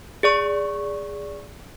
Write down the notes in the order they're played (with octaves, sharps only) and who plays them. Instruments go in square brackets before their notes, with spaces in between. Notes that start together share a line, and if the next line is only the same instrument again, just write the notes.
[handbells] G#4 D5 C#6